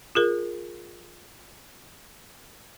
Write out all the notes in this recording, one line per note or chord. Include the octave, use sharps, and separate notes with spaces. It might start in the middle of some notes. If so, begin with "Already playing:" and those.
F4 G#4 A#4